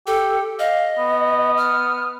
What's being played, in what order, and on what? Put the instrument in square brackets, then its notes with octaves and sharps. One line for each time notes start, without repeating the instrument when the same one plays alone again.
[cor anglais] G4 [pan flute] A4
[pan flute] D#5 [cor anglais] F5
[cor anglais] B3
[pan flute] F6